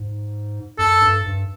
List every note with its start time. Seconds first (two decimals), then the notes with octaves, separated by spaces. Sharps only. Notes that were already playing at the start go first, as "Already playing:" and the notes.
Already playing: G#2
0.78 F#2 A4
1.02 G2
1.26 G2